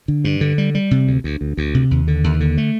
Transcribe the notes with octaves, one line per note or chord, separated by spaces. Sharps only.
D3
G2
D3
G3
G3
C3
D2
D2
D2
D2
C3
D#2
D3
D#2
D3
A3